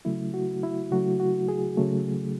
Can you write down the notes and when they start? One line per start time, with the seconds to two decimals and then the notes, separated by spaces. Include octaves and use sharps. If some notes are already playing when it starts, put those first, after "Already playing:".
0.05 C#3 F#3 A3 E4
0.34 F#4
0.63 E4
0.91 C#3 F#3 A3 F#4
1.20 F#4
1.48 G#4
1.77 C#3 F#3 A3